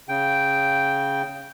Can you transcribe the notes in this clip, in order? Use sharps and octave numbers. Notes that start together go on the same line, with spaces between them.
C#3 G5